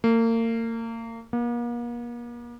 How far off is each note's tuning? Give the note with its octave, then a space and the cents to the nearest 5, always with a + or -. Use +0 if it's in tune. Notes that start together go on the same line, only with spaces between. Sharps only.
A#3 -35
A#3 +40